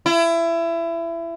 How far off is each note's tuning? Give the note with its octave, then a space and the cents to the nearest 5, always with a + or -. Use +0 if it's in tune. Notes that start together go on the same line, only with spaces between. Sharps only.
E4 +25